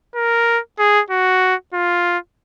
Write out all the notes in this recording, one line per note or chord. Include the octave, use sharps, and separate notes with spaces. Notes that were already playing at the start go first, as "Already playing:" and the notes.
A#4
G#4
F#4
F4